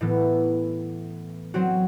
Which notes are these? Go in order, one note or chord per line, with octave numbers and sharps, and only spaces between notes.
A2 E3 B3
F#3 C4 F#4